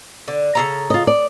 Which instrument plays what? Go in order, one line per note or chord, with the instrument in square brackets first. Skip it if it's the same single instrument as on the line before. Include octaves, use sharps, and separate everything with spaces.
[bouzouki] D3
C#3 A4 A#5
[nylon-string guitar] F4 D#5
D5